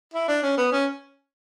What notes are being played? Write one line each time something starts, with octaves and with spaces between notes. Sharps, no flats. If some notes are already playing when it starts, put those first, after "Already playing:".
E4
D4
C#4
B3
C#4